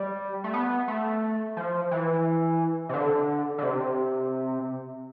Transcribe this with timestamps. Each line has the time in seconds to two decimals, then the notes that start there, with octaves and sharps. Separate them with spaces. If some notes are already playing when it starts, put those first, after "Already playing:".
Already playing: G3
0.44 A3
0.54 B3
0.88 A3
1.57 F3
1.91 E3
2.89 C3
2.94 D3
3.58 D3
3.63 C3